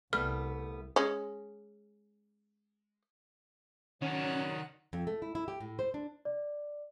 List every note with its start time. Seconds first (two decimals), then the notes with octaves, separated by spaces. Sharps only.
0.13 C2 G3 A3 B3 F6
0.96 G#3 C#4
4.02 D#3 F#3 C#4 D4 F#5
4.93 F2
5.07 A3
5.22 E4
5.35 E4
5.48 G4
5.60 A2
5.79 C5
5.94 D4
6.25 D5